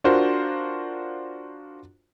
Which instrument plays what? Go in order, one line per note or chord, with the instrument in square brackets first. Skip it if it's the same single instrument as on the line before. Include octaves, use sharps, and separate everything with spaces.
[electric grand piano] D4 F4 F#4 A#4 C5